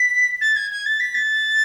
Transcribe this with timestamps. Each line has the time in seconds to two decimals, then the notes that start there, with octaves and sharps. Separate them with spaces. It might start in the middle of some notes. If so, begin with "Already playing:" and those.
Already playing: B6
0.41 A6
0.56 G#6
0.71 G#6
0.86 A6
1.00 B6
1.15 A6